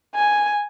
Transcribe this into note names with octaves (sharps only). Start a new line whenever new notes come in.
G#5